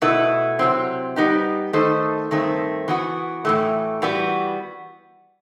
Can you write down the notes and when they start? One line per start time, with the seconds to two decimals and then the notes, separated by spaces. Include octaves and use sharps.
0.02 B2 A3 E4 B4
0.59 C3 F#3 C4
1.16 G3 B3 D#4 G4
1.73 D#3 A3 D#4 A4 C5
2.31 G2 D#3 A3 C4
2.88 E3 B3 F#4
3.45 A2 E3 A3
4.02 E3 G3 B3 F#4